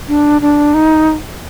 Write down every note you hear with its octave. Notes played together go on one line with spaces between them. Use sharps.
D4
D4
D#4